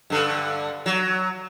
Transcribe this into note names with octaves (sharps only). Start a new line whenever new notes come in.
G2 D3
F#3